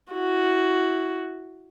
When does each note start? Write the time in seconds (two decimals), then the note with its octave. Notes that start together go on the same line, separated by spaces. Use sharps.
0.12 E4 F#4